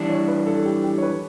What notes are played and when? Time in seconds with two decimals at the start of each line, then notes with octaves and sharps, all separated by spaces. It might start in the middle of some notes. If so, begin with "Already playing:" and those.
Already playing: E3 G3 D4
0.09 C#5
0.28 B4
0.46 A4
0.65 G4
0.84 G4
0.98 C#5
1.02 B4